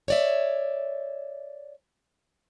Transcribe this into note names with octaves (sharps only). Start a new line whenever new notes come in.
C#5 D5 E5